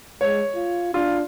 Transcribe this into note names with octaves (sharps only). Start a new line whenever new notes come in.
G#3 C#5
F4
D4 F4